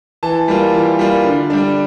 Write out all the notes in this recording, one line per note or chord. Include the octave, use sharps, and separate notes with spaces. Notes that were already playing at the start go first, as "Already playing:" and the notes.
E3 A5
G3 A#3 F4
E3
G3 A#3 F4
D3
G3 D4